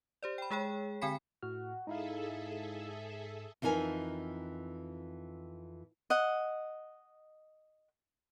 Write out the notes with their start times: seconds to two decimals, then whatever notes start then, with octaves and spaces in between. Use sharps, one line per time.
0.23 G4 C5 D5
0.38 G5 B5
0.51 G#3 G#4 C#5 G5
1.01 D3 C4 G5 G#5 B5 B6
1.43 A2 F#4 F6
1.87 G#2 D#4 E4 G#4 A4 E5 F5
3.62 F2 E3 D#4 A#4 G#5
6.10 D#5 F#5